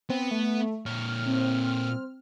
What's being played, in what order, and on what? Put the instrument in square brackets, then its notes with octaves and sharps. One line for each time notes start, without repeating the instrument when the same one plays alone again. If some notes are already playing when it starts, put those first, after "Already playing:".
[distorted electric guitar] B3 [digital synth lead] C4
[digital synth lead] A3
[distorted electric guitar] A#2 C#5 [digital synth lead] F6
[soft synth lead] C4